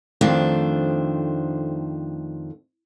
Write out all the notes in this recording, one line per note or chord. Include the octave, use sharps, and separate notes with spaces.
F2 D#3 A3 D4 C5